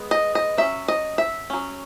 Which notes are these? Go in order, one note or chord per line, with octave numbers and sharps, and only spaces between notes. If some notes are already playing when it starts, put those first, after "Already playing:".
Already playing: G#3 B3
D#5
D#5
F#3 C#4 E5
D#5
E5
F#3 C#4